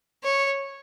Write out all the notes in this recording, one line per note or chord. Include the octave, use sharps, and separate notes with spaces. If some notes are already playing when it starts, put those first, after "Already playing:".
C#5